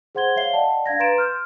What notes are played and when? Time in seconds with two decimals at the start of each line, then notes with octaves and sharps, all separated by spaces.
0.15 G#4 C5 F#5 C6 G#6 G7
0.36 C#5 E5 F5 C7 G7
0.53 D5 D#5 F#5 G5 A5
0.86 D4 F5 G#6 A#6
0.99 B4 A#5 C6 A6 D7 E7
1.17 C6 F6 G6